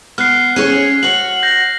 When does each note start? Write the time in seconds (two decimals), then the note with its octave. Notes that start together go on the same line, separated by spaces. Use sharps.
0.18 B3 F6 F#6 C7
0.56 C#4 G#4 C#5
1.03 F#4 C#5 F#7
1.43 G6 A#6